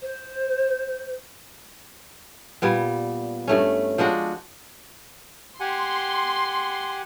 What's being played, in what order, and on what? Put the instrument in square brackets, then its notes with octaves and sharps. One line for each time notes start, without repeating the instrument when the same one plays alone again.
[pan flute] C5
[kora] A#2 G3 B3
G2 A3 C#4
F3 G#3 D4 F#4
[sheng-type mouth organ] G4 F#5 G#5 [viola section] C6